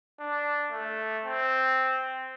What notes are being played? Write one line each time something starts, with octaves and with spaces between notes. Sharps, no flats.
D4
A3
C4